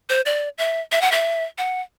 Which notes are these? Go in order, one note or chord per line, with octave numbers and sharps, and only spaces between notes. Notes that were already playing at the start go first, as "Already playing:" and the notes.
C5
D5
E5
E5
F#5
E5
F#5